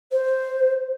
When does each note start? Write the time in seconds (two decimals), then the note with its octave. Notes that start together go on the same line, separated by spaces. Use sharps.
0.11 C5